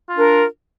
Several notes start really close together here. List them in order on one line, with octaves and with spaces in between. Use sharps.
F4 D4 A#4